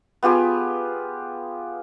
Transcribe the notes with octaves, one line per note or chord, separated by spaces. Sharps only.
B3 F4 G4 G#4